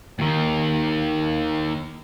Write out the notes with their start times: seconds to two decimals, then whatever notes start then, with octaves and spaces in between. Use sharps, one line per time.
0.19 D#2 D#3